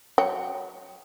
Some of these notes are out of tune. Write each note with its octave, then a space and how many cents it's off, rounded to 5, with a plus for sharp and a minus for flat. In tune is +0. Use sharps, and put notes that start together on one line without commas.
F#3 +0 C#5 +10 G5 -5